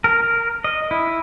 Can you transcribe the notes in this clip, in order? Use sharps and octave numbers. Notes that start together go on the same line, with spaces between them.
A#4
D#5
E4